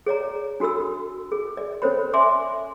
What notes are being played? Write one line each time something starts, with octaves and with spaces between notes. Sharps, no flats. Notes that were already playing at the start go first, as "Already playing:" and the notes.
G#4 C#5 D5 A#5
D4 F#4 A4 B5 E6
G#4
D5
C#4 A4 C5 C#5 B5
D5 E5 G#5 C6 D6